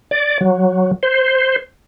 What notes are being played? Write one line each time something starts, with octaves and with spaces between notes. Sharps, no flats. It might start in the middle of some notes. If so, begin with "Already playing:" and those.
D5
F#3
C5